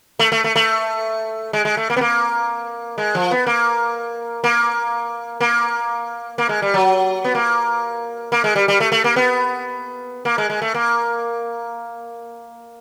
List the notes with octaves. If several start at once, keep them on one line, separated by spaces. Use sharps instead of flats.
A3
A3
A3
A3
G#3
G#3
A3
A#3
B3
A#3
G#3
F3
B3
A#3
A#3
A#3
A#3
G#3
G3
F#3
B3
A#3
A#3
G#3
G3
G3
A3
A3
A#3
B3
A#3
G#3
G#3
A3
A#3